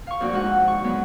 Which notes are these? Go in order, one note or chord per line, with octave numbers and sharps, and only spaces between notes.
F5 C#6
F2 A#2 D4 F#4 D5
G#3 D#4 F#4 F#5
F2
C#6
F#3 G#3 B3